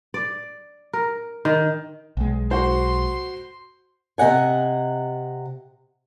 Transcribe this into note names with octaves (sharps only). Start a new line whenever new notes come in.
D5
A#4
D#3
B1 G#3
F#4 C5 C6
C3 D#5 F#5 G#5